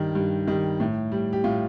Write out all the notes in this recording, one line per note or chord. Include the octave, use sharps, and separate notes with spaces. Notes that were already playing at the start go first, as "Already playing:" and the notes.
Already playing: G2 D#3 G3
G2
D#3 G3
A2
G3
G4
A2 F4